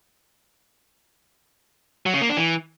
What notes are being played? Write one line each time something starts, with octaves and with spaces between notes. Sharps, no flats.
F#3
C#3
A#3
D4
E3